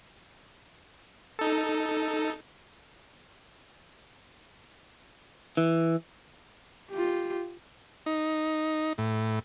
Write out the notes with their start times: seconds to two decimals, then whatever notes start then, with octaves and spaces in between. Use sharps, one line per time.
1.39 D#4 A4
5.57 E3
6.91 F4 G4
8.06 D#4
8.98 A2